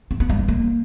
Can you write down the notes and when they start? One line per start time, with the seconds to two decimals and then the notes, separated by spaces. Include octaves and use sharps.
0.11 C4
0.20 B3
0.30 G3
0.39 E3
0.48 A#3